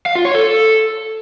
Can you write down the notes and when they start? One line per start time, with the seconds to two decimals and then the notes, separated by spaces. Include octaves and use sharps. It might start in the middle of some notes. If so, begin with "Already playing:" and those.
0.06 F5
0.15 F4
0.25 C#5
0.35 A4